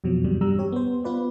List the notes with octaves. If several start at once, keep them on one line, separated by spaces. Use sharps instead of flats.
F2 B2 F3 F#3
E2 G#2 C3 G3
G2 G3 A#5 E6
G4 C#5
B3 C5
B3 F4 B4 D5